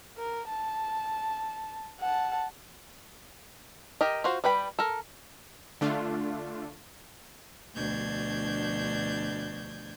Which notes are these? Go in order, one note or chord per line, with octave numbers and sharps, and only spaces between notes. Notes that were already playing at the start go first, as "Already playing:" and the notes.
A#4
A5
F#5 A5
G4 A#4 D#5
F4 F#4 C5
G3 B4 G5 B5
A4 A#4
D3 A3 D4 F4
D2 B2 F3 D4 G6 G#6